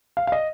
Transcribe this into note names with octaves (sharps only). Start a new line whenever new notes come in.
F5
F5
D#5